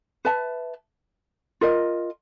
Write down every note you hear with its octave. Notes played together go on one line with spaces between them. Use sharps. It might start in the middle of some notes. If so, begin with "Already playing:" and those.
B4 E5 A5
F4 A#4 D#5